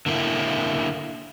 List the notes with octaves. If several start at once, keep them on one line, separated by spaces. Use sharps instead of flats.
D3 A#3 E4